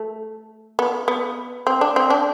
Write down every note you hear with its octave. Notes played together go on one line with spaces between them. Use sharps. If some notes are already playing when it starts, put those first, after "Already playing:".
Already playing: A3
B3
B3
C4
D4
C4
D4